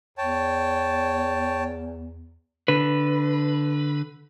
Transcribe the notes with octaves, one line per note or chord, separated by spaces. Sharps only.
E2 C#5 G5 A5
D3 B4